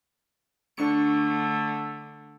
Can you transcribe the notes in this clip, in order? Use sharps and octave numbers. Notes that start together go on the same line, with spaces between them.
D3 A3 D4 C#6 C#7